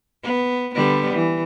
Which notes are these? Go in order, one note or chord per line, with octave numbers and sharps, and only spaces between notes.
B3
D3 G3 B3
E3